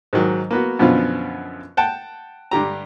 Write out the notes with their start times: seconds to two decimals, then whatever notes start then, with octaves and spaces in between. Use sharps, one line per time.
0.13 G#2 D#3 F#3
0.51 A#3 B3 F#4
0.79 F#2 B2 D3 F3 B3 F4
1.77 F#5 G5 A5
2.51 G2 D3 G4 A#5